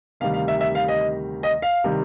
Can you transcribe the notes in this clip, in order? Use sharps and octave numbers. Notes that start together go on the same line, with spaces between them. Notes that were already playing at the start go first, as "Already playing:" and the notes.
D2 C3 D#3 G3 F5
F5
E5
E5
F5
D#5
D#5
F5
C3 D#3 G3